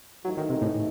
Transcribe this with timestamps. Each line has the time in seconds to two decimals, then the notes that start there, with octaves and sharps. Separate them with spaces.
0.24 G#2 E3 F#3 A3 D#4
0.37 D#3
0.50 C3
0.61 A2